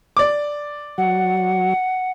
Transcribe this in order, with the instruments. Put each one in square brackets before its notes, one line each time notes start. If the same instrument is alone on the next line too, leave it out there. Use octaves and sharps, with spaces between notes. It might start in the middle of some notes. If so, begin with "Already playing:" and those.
[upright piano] D5 D6
[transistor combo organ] F#3 [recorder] F#5